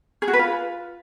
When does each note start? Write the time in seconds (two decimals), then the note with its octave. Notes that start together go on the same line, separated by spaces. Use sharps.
0.22 G#4
0.28 F#4
0.33 B4
0.39 F4